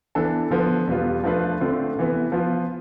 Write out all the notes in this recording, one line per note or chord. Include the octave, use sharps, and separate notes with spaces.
E3 B3 D4 A4
D3 F3 B3
E2 B2 G3 B3 F4
F3 A3 D4 F4 B4
D3 A3 C4 F4
C3 E3 B3
F3 B3 F4